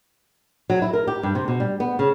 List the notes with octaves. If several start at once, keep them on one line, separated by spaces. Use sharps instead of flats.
F#3
E4
A#4
G4
G2
C3
B2
G3
B3
C#3